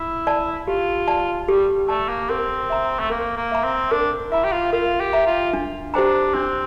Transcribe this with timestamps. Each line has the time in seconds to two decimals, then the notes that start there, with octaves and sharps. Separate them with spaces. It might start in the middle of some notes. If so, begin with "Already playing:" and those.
Already playing: E4
0.27 D5 A5
0.67 F4 G4
1.08 D5 A5
1.48 G3 G4
1.89 A3 D5 A5
2.09 A#3
2.29 C4 A#4
2.70 E5 A#5
2.99 A3
3.10 A#3 A#4
3.37 A#3
3.51 E5 A#5
3.64 C4
3.91 D4 A#4
4.32 E4 E5 A#5
4.44 G4
4.52 F4
4.73 F4 A#4
5.00 G4
5.13 E5 A#5
5.26 F4
5.53 D4
5.94 D4 G4 C5 G5 A#5
6.34 C4 D4